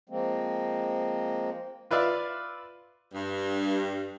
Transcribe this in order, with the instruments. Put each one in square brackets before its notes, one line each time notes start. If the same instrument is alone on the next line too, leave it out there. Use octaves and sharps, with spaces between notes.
[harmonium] F3 G#3 A#3 C4
[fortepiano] F4 B4 D5 E5 F5
[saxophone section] G2